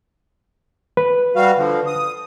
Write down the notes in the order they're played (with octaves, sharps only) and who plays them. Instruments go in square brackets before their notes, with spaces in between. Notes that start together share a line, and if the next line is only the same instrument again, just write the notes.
[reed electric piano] B4
[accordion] G3 F#4 F5
D3 F3
D#6